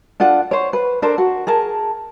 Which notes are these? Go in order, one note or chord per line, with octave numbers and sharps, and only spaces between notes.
D4 F4 A4 F#5
C5 C#5
B4
D4 A4 A#4 C5
F#4
G#4 A#4 A5